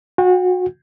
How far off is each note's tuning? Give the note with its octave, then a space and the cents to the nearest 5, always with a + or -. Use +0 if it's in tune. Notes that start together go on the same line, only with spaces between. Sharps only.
F#4 -30 G5 +20